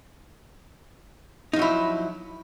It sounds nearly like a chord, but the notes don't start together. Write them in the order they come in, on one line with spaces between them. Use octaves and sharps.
D#4 F3 F#3 E4